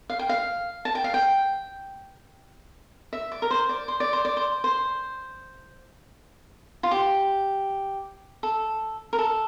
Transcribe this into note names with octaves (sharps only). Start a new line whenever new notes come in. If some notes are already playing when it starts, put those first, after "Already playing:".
F5
G5
F5
A5
G5
F5
G5
E5
D5
A#4
C5
D5
C5
D5
C5
D5
C5
C5
F4
G4
A4
A#4
A4